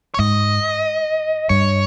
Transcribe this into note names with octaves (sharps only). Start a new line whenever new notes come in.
C#5
G#2 D#5
G2 C#5